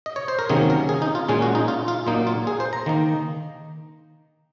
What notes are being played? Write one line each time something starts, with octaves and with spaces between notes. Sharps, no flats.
D#5
C#5
C5
A#4
C3 D#3 F#3 A#3 C#4 G#4
A#4
G#4
D#4
F4
A#2 G#3 C#4 G#4
F#4
D#4
F4
F4
A#2 F#3 A#3 D#4
F4
G#4
C5
A#5
D#3 A#3 D#4